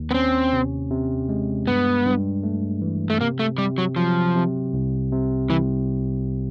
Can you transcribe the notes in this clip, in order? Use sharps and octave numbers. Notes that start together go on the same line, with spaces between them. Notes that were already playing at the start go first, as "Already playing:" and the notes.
Already playing: D#2
B3
C4 C#4
C3
C3
G#3
G2 B3
G2
A3
E3
A3
C3 A#3
A3
C3 G3
F#3
F3 F#3
C3
C2
C3
C2 E3